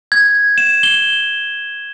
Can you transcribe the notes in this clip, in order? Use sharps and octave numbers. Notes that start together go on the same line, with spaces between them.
G#6
E7
G7